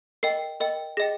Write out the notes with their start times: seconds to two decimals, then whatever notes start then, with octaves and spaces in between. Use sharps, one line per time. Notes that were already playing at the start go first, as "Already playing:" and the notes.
0.23 A#4 D#5 G5 C7
0.60 A#4 D#5 G5
0.97 G#4 D#5 G5 A#6